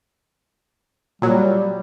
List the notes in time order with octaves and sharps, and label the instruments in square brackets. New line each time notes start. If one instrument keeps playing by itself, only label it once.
[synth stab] A#2 F#3 [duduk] G3